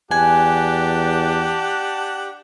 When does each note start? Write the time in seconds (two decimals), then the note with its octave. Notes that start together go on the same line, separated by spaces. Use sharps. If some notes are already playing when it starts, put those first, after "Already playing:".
0.11 E2 D4 G4 F#5 G#5 A5